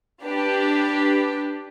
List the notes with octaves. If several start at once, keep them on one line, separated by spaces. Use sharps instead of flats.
D4 G4 B4